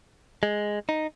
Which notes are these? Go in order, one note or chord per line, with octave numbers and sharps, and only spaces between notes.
G#3
D#4